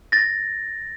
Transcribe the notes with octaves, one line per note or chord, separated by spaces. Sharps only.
A6 A#6